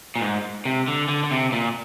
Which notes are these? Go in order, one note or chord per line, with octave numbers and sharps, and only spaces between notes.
A#2
G#2
C3
D3
D3
D3
C3
A#2